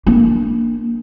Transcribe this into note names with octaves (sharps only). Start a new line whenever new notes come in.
A#3 D4